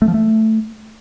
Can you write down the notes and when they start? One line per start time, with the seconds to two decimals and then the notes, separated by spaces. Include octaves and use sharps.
0.02 A3
0.08 F3
0.14 A3